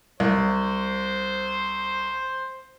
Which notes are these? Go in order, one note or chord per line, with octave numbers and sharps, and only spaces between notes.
C2 C5